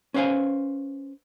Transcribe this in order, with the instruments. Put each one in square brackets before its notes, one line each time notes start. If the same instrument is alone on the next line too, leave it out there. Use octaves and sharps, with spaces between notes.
[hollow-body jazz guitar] C#4 B4 C5 F5 G#5